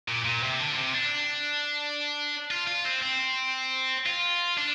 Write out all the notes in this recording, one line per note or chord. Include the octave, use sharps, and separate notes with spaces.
A#2
A#2
C3
D3
A#2
C3
D4
F4
F4
C4
C4
F4
D4